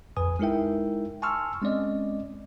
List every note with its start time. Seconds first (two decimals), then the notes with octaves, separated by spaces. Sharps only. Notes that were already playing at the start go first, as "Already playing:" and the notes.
0.17 A#1 F2 B4 G#5 D#6
0.39 G#3 D#4 E4 A#4 E5 G5
1.22 G#5 A5 C6 C#6 E6 F6
1.62 G#3 C4 C#4 D5 D#5